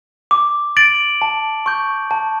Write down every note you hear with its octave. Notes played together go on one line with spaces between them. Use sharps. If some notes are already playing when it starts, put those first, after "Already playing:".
D6
A6 D7 F#7
A5
C#6 G6
A5